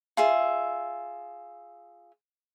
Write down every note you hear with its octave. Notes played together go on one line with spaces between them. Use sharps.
F4 G#4 E5